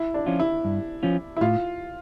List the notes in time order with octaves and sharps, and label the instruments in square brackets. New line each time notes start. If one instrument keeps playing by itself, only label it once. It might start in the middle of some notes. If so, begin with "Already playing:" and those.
Already playing: [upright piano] E4
D4
[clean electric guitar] F3 C#4 F4
[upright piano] E4
[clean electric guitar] G2
F3 C#4 F4
[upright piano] E4
[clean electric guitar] A2 [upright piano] F4